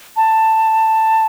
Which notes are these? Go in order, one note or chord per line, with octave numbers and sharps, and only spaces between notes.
A5